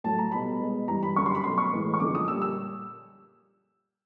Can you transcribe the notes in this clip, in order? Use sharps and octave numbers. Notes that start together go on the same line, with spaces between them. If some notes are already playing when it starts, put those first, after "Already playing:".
A2 F#3 A3 A5
A#5
B2 G3 B5
B2 G#3
G2 E3 G3 A#5
B5
F#2 D3 G3 C#6
C6
B5
B2 F#3 A3 C6
C#6
A2 E3 G#3
C#6
F#2 D3 F3 G#3 D6
D#6
A#2 G3 E6
E6